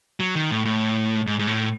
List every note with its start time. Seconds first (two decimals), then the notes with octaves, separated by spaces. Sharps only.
0.20 F#3
0.36 D#3
0.51 A2
0.65 A2
1.27 G#2
1.39 G#2
1.47 A2